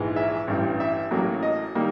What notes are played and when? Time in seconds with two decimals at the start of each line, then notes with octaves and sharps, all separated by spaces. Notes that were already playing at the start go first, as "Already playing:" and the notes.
Already playing: A#1 G#2 E3 G#3
0.16 E5
0.47 A1 G2 E3
0.80 E5
1.11 A1 A2 F#3 A#3
1.43 D#5
1.75 D#3 G3 A#3